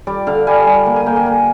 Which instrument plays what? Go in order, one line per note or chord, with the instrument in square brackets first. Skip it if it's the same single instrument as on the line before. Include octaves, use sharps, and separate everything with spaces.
[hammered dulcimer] G3 D5
D3 F5
G3 G#5
G3 G#5
A#3
G#5
A#3 G5
G#5
A#3